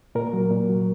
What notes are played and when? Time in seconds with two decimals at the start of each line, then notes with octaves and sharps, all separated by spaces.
0.15 A#2 A#4
0.33 F#3
0.51 A#2
0.69 F#3